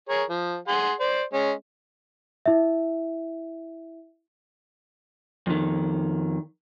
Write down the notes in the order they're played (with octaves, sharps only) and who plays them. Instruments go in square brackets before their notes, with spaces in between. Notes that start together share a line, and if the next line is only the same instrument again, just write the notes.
[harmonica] G#4 A#4 C#5
F3
G#4 F#5 C6
C5 D5
G#3 C#4
[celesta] E4 E5
[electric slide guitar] F2 D#3